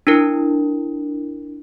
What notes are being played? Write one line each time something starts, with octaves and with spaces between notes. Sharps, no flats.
D4 E4 A#4